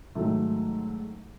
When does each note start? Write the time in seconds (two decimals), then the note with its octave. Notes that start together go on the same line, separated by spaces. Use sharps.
0.15 G#2 D#3 F#3 A3